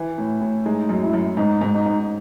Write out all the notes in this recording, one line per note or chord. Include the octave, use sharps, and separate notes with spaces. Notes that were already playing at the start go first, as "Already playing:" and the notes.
Already playing: E3
A2
A2
G#3 D#4
F#2
E4
F#2
G#2 D#4
G#2
D#4
G#2